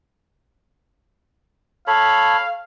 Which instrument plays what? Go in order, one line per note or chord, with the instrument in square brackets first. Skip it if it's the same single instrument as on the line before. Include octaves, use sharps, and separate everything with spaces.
[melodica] A4 C#5 B5 [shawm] F5